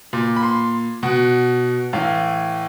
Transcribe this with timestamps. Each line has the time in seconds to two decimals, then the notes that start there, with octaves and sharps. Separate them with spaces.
0.13 A#2
0.36 B5
0.43 C6
1.03 B2 F#5
1.93 A2 E3 F5